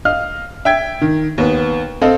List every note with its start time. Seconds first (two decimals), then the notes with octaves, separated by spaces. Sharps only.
0.05 D#5 F5 F6
0.65 E5 G5 G#6
1.01 D#3
1.38 D#2 B3
2.02 C4 A4 C5 D#5 F5